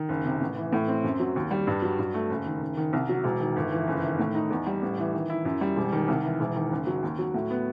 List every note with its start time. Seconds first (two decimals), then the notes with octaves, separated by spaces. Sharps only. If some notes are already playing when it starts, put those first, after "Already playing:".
Already playing: D#3
0.09 F#1
0.25 C3
0.41 A1
0.57 E3
0.73 A2
0.88 C4
1.04 F#2
1.20 F#3
1.36 D#2
1.51 G3
1.67 G2
1.82 F#3
1.99 G2
2.14 A3
2.30 F#1
2.46 D#3
2.62 F#1
2.77 D#3
2.93 C2
3.09 F#3
3.24 E1
3.40 D#3
3.56 G1
3.72 E3
3.87 F#1
4.04 D#3
4.19 A2
4.35 D#4
4.50 E2
4.66 G3
4.82 A1
4.98 E3
5.13 D#3
5.30 E4
5.45 F#2
5.61 G3
5.76 E1
5.92 D#3
6.08 C2
6.24 E3
6.40 E1
6.56 D#3
6.71 F#1
6.87 F#3
7.03 D#2
7.19 F#3
7.34 A2
7.50 B3